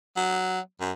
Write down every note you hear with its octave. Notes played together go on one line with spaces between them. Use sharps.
F#3
F#2